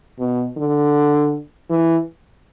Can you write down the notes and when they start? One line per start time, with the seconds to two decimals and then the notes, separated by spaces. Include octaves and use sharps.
0.19 B2
0.57 D3
1.70 E3